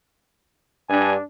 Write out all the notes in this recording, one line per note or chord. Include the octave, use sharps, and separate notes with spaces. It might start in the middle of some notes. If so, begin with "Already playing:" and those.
G2 D4 G#5